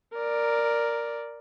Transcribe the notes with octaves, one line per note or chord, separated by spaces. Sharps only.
A#4 D5